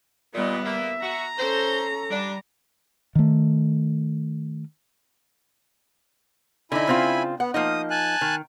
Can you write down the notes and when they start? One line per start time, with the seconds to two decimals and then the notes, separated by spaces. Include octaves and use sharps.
0.35 A#2 G3 B3 D#5
0.65 A#3 E5
1.02 F#4 A#5
1.39 C#4 A4 C5
2.11 G3 D4
3.15 D#3 A3
6.72 D3 D#4 E4 G#5 B5
6.87 C#3 C4 F4
7.40 B3 F#5
7.54 F3 A#3 D#4 D#6
7.90 G#5 A5 F#6
8.21 D#3